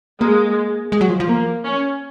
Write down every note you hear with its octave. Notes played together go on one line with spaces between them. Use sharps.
G#3 A#3
G#3
F#3
F3
F3
A#3
C#4